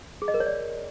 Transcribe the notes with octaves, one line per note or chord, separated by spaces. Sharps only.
G#4
D#5
A#4
C#5
D5